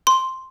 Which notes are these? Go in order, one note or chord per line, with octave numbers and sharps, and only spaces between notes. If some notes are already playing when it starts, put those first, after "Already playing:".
C6